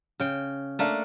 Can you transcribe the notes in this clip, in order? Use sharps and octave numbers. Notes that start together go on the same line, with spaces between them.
C#3 G5
A3 A#3 D4